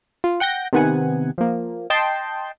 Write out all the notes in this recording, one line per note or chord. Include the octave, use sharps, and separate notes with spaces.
F4
F#5 G5 G6 A#6
C3 D#3 B3 F#5 G#5
F3 A#3
D#5 G5 A5 C6 G6 C7